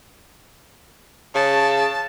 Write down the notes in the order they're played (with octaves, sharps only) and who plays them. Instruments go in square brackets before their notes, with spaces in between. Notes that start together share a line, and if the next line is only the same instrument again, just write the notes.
[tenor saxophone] C#3 [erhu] A5